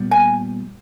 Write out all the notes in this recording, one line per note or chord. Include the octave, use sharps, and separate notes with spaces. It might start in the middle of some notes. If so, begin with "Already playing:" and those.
Already playing: A#2 G3 B3
G#5